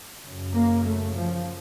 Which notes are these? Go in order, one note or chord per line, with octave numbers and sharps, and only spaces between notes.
F#2 C#3
A#3
A3
F3